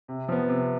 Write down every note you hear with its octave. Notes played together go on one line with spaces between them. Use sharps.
C3
F3 B3
C3